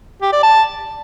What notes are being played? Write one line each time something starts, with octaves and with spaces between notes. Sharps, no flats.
G4
D5
A5